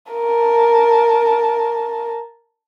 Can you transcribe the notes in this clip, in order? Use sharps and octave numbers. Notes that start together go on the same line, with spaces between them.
A#4 A5